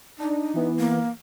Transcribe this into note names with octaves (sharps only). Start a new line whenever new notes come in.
D4 D#4
E3 B3
A#3